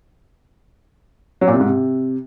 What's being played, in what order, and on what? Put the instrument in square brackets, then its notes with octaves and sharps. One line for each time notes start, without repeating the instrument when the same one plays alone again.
[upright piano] F#3
A#2
C3
G#2
C3